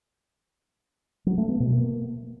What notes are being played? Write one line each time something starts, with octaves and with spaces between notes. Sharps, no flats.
F#3
A3
B3
B2
A#3